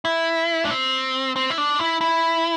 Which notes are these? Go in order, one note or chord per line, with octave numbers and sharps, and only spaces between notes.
E4
D4
C4
C4
E4
D4
E4
E4